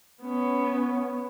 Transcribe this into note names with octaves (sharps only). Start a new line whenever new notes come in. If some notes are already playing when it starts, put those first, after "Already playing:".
B3 C#4